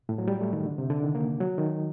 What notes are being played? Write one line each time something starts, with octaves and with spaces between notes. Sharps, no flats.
A2
F#3
G3
A3
D#3
D3
C3
D3
D#3
A#3
F#3
D#3